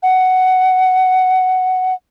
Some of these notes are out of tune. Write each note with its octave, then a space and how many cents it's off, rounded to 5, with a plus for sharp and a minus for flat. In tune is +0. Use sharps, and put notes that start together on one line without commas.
F#5 +10